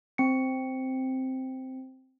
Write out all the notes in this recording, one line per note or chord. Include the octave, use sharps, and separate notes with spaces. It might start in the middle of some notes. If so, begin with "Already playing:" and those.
C4 C#7